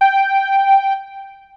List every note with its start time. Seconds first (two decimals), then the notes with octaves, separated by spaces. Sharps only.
0.01 G5